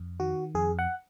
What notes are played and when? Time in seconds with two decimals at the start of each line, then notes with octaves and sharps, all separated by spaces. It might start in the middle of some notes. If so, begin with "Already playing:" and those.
Already playing: F2
0.20 D#3 F#4
0.55 F2 G#4
0.79 F#5